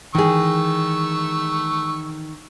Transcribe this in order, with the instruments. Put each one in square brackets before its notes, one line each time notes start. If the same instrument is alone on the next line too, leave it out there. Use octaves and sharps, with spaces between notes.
[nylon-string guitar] D#3 G#4 [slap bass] E3 [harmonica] C#6 E6